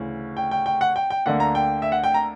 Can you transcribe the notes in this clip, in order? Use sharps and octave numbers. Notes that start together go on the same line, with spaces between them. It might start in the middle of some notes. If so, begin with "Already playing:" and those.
Already playing: D2 C#3 E3
G5
G5
G5
F#5
G5
G5
D2 D3 A#3 F#5
A#5
G5
E5
F#5
G5
A#5